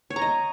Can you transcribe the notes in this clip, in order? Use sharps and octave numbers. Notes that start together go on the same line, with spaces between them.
C#5
A#5
D#5